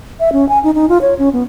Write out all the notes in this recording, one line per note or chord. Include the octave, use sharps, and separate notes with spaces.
E5
C#4
G#5
D#4
D#4
F4
C#5
C#4
B3